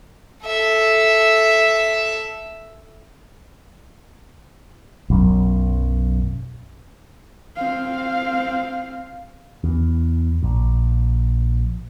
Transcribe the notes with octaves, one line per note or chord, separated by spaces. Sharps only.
A4 E5
B1 F#2
C4 F5
E2
A#1